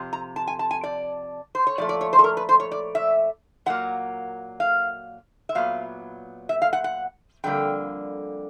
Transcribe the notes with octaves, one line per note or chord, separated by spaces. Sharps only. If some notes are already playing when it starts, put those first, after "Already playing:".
Already playing: F2 C3
A#5
A5
G#5
A5
G#5
D5
C5
C#5
A#2 F3 A3 D5
D5
C#5
C5
A4
A#4
B4
C5
C#5
D5
E5
A#2 F#3 A#3 F#5
F5
E5
A#2 F#3 B3 F5
E5
F5
F#5
F#5
F2 D3 G3 A#3 G5